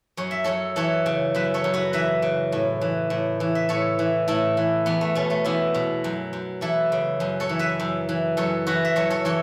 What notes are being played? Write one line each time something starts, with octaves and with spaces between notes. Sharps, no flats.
F#2 C#5
E5
F#2 A4 C#5
E3 A4 C#5
C#3
F#2 B4 E5
A4 C#5
F#2
F#4 B4
E3 B4 E5
C#3
A2
E3
A2
E3
E5
A2 A4 C#5
E3
A2 E4 A4
E3
E2 B3
A3
B2 A3 C#4
A3 C#4
E2 B3 E4
B2
F#2
F#2
E3 E4 A4
C#3
F#2
A4 C#5
E3
B4 E5
F#2
E3
F#2 A4 C#5
E3 F#4 B4
E5
F#2 A4 C#5
A4 C#5
E3 A4 C#5